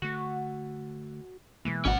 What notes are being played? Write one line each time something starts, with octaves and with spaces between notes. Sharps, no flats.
D3 A3 F#4
B2 E3 G#3 A#3
G#1 C#4 F#5